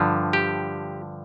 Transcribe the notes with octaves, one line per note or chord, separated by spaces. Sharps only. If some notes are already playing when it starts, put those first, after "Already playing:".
Already playing: G2 D3 F3
G4